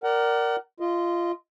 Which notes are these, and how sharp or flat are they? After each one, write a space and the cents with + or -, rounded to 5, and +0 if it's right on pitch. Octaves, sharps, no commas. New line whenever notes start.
A#4 +0 D5 +0 F#5 +30
F4 -15 D#5 +5